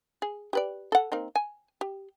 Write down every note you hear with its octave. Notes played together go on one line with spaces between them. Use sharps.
G#4
G4 B4 D5
A4 F#5
A#3 C4 D#4
G#5
G4